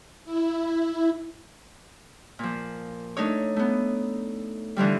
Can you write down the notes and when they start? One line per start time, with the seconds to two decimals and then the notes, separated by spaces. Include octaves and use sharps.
0.25 E4
2.39 A#2 F3
3.17 A3 D4 D#4 C#5
3.56 A3 B3
4.76 D3 E3 F3 G3